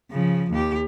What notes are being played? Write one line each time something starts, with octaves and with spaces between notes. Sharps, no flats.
C#3 F3
D#2 G4